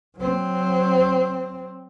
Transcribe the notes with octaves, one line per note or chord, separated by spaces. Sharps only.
F#3 C4